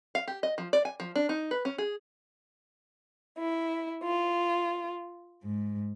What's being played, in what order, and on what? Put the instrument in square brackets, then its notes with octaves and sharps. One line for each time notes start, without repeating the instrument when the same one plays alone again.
[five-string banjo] F5
G4
D#5
F3
D5
G#5
F3
D4
D#4
B4
C#4
G#4
[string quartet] E4
F4
G#2